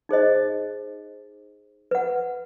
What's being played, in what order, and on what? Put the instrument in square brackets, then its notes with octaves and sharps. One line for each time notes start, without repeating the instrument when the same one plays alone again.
[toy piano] D#4 G#4 C5 D#5
B4 F#5